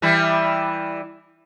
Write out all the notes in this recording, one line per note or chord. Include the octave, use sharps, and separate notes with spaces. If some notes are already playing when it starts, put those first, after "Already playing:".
E3 G3 E4